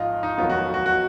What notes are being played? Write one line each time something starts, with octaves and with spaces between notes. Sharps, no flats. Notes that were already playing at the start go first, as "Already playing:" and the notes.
Already playing: G#1 G#2 F3 F4 D#5
D#4
F1 F2 D#3 F#3 B3 F4
F#4
F#4
F#4